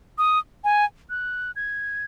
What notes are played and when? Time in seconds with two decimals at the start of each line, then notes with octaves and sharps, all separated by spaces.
0.18 D#6
0.64 G#5
1.10 F#6
1.56 G#6